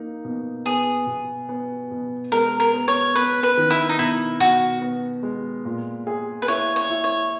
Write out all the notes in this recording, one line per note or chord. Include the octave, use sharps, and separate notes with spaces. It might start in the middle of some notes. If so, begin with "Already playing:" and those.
Already playing: A#3 D#4
B2
B3 G#4
B2
B3
B2
G#3 A#4
A#4
B3
C#5
B3 B4
B4
D#3
E4
D#4
B2 E4
B2 F#4
B3
G#3
A#2
G#4
B4
E4 C#5
C#5
E4
C#5